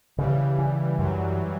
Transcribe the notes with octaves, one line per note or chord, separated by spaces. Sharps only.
C#3 E3 G3
E3
F#2 F#3